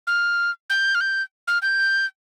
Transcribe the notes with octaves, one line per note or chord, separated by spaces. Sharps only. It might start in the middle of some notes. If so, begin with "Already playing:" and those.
F6
G6
F6
G6
F6
G6